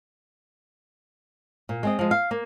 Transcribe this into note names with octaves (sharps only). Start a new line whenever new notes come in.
A#2
G#3 C4 D#5
F3 G#3
F5
A#3